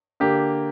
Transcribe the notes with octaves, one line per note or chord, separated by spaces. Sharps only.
D3 A#3 G4